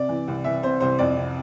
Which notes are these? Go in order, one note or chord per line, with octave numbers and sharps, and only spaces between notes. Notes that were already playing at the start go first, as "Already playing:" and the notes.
Already playing: C3 D5
E3
C2
E3 E5
C3 C5
C2 C5
F2 D5
C3